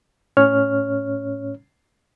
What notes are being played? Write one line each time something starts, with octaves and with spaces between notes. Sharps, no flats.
A2 C#4 C#5 F6